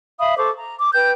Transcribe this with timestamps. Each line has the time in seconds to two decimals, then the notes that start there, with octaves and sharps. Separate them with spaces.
0.19 E5 F5 B5 D#6
0.37 A4 C5 C#6 D6
0.57 A#5
0.79 D6
0.94 B4 G5 G6